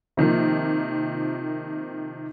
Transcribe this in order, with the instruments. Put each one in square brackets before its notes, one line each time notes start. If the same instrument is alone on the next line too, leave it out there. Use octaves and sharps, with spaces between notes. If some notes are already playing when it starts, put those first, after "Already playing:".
[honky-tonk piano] C3 D#3 F3 A#3